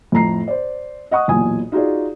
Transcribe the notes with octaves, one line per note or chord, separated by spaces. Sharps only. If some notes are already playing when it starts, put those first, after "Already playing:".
F2 A2 A#5 C7
C5 D5
D#5 F#5 C#6 D#6
B1 E2 A#2 G#5 D#6
D#4 F4 F#4 G#4 D5